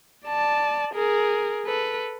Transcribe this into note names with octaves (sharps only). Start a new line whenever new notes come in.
D5 A5
G#4 A#4
A4 B4